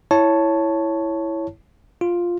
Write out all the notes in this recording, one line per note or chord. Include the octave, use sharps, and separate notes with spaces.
E4 C#5 A5
F4